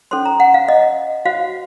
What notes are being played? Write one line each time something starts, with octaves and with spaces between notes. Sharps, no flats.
C#4 A4 C5 C6
A#5
F#5
F5
D#5
F#4 C5 F5